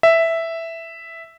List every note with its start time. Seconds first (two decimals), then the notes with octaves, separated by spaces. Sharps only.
0.03 E5